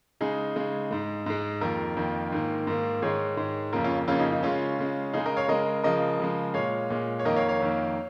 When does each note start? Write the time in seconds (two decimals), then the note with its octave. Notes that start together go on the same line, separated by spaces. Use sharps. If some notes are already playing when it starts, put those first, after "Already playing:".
0.21 C#3 G#3 D#4 G#4
0.56 C#3 G#3
0.91 G#2 G#3
1.26 G#2 G#3
1.61 F2 D#3 A#3 F4 A#4
1.96 F2 D#3 A#3
2.32 G#2 D#3 A#3
2.67 G#2 D#3 A#3
3.02 G#2 D#3 G#3 G#4 C#5
3.37 G#2 D#3 G#3
3.73 F2 C#3 A#3 F4 A#4
3.84 C#4 F4
4.08 F2 C#3 A#3 C#4 F4
4.20 D#4 G#4
4.31 D#4
4.43 C#3 G#3 C#4 F4
4.79 C#3 G#3
5.13 C#3 G#3 D#4 G#4
5.26 A#4 D#5
5.37 C#5 F5
5.48 C#3 G#3 A#4 D#5
5.83 C#3 F3 G#3 A#4 D#5
6.20 C#3 F3 G#3
6.54 A#2 G#3 C#5 F5
6.90 A#2 G#3
7.20 C#5
7.25 F2 D#3 A#3 A#4 D#5
7.36 C#5 F5
7.48 C#5 F5
7.60 F2 D#3 A#3